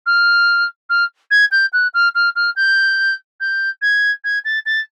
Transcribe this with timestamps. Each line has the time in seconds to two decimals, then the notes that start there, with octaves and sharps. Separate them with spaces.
0.06 F6
0.89 F6
1.30 G#6
1.51 G6
1.73 F#6
1.94 F6
2.14 F6
2.35 F6
2.56 G6
3.40 G6
3.81 G#6
4.24 G#6
4.45 A6
4.65 A6